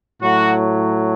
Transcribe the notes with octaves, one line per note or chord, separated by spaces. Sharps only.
A2 F#3 A3 F#4